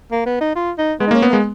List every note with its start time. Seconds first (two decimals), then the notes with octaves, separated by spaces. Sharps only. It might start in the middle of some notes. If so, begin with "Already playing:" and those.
0.12 A#3
0.26 B3
0.41 D#4
0.56 F4
0.78 D#4
1.00 G#3 B3
1.07 D#4
1.11 A#3 C#4
1.22 B3
1.29 G#3 A#3